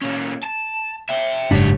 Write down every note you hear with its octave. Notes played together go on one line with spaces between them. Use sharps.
A#2 C#4
A5
E5 G5
F#1 G#2 G3 D4 C#5